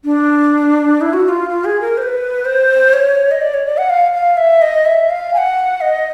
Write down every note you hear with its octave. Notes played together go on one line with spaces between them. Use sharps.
D4
E4
F#4
F#4
F4
F4
G#4
A#4
C5
B4
C5
C#5
D#5
D5
C#5
D5
F#5
F5
F5
E5
D#5
E5
F5
G#5
F#5
D#5